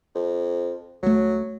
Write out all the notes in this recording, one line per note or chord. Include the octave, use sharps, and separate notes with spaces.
F2
C#2 F#3 A3